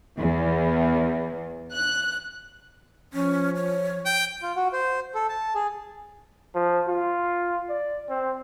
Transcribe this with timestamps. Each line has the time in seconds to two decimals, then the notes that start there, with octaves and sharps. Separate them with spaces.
0.17 E2
1.73 F#6
3.13 F3 C#4
3.56 C#5
4.06 G5
4.42 F4
4.56 F#4
4.73 C5
5.15 A4
5.29 A5
5.55 G#4
6.55 F3
6.87 F4
7.69 D5
8.10 C4